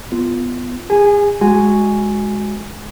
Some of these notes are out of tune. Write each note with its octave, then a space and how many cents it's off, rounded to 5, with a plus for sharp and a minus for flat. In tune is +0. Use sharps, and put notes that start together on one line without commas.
B3 +10 F4 -10
G#4 -35 G#5 +0
G#3 +0 F#4 -5 G#5 +0